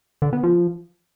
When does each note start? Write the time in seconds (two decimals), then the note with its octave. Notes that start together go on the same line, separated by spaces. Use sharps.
0.22 D3
0.33 B3
0.44 F3